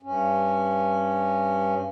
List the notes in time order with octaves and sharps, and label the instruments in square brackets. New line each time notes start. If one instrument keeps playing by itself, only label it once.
[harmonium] G2 C#4